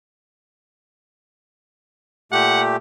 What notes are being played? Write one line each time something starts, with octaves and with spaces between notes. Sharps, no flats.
A#2 A3 G4 F#5